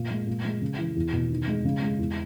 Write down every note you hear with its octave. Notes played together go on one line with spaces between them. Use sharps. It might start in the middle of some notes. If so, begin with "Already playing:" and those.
Already playing: A#2
G#3
A#2
G#3
C#3
E3
E2
B2
D#3
G#3
C#3
G#3
E2